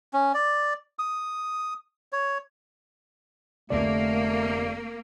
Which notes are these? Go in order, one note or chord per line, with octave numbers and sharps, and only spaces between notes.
C#4
D5
D#6
C#5
F1 D3 A3 A#3 D5